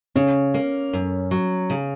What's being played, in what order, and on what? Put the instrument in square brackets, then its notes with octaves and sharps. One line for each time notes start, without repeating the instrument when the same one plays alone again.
[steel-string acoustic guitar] C#3 [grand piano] C#4
[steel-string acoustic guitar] A#3
F#2
F#3
C#3